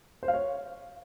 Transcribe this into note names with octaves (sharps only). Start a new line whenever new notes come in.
C5
F5
C#5